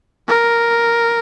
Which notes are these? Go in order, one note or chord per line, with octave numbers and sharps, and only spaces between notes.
A#4